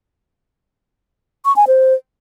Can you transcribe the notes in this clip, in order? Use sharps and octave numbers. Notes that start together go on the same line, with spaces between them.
C#6
G#5
C5